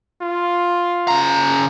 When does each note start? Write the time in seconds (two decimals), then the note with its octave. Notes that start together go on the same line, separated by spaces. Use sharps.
0.22 F4
1.08 C#3 A#5